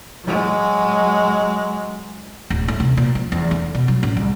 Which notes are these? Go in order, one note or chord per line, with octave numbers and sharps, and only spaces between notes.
F#3 G#3
D1
A3
C3
A#2
F3
E2
D3
B2
F#3
A1
C2